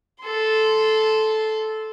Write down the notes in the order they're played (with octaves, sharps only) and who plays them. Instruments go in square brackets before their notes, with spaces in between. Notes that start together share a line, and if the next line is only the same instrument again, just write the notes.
[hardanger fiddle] A4 C6